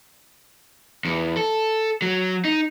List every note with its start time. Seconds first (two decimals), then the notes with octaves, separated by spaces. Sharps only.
1.05 E2
1.37 A4
2.02 F#3
2.45 D#4